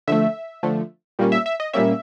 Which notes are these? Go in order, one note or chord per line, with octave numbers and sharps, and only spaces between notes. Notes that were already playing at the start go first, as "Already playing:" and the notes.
D3 F3 A3 E5
D3 F3 A3
A#2 G3 A#3 C#4
E5
E5
D#5
A#2 G3 A#3 C#4 E5